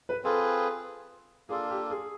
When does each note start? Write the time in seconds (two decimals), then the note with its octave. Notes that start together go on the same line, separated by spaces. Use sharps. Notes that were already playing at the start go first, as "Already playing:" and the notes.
0.09 B4
0.24 C4 F4 G#4 A4 B4
1.49 A#3 D4 F4 G#4 A4
1.70 G4
1.90 G#4